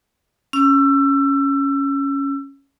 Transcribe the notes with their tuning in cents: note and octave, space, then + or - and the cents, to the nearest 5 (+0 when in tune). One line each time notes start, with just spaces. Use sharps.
C#4 +0 E6 +25